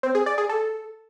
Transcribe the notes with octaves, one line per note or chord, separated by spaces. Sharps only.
C4
G#4
D5
G#4
A4